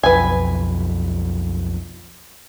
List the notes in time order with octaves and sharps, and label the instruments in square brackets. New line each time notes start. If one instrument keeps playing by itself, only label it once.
[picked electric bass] B1 F2 [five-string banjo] B4 G#5